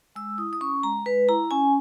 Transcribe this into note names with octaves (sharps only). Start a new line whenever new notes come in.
G#3 E6
E4 D#6
D#6
C#4 C#6
G#3 A#5
G#3 B4
E4 A#5
C#4 G#5